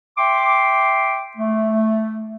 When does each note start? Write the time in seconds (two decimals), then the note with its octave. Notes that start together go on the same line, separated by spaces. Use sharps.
0.18 E5 G5 C6 D6
1.38 A3